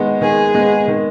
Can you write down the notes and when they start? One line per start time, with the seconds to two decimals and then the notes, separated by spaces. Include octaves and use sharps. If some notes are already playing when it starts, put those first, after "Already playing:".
Already playing: D#3 G#3 B3
0.21 D#3 G#4
0.55 G#3 B3
0.88 D#3